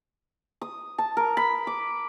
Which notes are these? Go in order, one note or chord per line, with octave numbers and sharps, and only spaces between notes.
D#6
A5
A#4
B5
D6